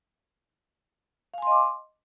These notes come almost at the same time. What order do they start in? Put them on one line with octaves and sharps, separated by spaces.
F5 G#5 C6 D#5 D6